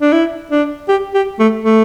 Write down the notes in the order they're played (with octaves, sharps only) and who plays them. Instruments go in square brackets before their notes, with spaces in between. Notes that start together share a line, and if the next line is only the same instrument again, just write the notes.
[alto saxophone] D4
E4
D4
G4
G4
A3
A3